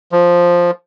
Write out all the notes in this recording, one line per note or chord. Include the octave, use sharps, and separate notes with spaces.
F3